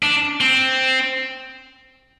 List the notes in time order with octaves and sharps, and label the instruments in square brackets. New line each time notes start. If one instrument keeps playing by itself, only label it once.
[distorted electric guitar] D4
C4